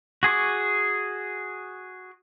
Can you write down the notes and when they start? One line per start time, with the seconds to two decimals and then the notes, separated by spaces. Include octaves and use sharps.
0.23 F#4 G#4 C#6 D6